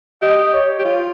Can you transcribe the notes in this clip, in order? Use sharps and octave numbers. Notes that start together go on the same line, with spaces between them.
G4 D#5
C#5
G4
F4